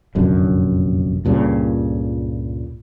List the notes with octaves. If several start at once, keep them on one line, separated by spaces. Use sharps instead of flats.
F1 A#1 F#2 D3
C#2 G2 A#2 C#3